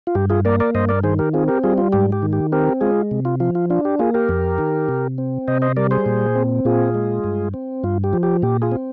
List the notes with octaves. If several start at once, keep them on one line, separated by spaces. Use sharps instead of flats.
F4
G2 G4
F4 G#4
A#3 A#4 D5
A#4 D5
G2 C5 D#5
A#4 D5
D#3 G#4 C5
G4 A#4
C4 F4 G#4
G4 A#4
G3 F4 G#4
F4
G#2 G4
G4
D#3
G4
C4 G4 A#4
G#3 F4 G#4
C3
F4
F3 F4
F4
D4 F4
G4
A#3 F4 G#4
G4 A#4
F2
D#3
C3
C4
C3 C5 D#5
C5 D#5
G3 A#4 D5
G#4 C5
A#2
C4
A#2 F4 G#4
G#3
G2
C4
G2 F4
G4
F3
G4
A#2 G4
F4 G#4
C4